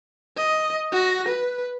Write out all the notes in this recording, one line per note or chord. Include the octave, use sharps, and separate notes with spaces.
D#5
F#4 A#6
B4